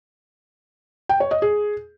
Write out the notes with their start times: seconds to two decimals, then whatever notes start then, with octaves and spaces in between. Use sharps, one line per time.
1.09 G5
1.20 C#5
1.31 D#5
1.42 G#4